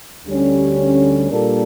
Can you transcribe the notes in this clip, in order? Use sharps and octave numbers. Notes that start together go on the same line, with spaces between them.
D2 D3 G3 C#4 G4
A#2 G3 A#3 D4 A4